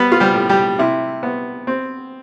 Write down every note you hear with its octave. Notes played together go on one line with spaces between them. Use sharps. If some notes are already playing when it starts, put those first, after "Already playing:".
Already playing: G3 B3 B4
F4
G3 G4
A2
G3 G4
C3 E4
B3
C4